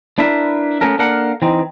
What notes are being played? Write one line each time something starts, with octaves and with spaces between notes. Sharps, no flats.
D4 E4 A#4 B4 E5
A3 B3 C#4 A4 A#4
A#3 D4 A4 A#4 F5 F#5
E3 C4 D#4